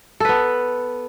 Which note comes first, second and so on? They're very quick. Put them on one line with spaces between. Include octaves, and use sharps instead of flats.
A4 B4 B3